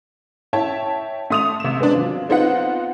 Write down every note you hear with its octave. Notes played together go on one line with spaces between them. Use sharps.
E4 C#5 E5 G5 A5
A3 C6 D#6 D#7 F7
C3 E7
G#3 B3 C4 D4
F#3 F4
B3 C4 D#4 F4 F#5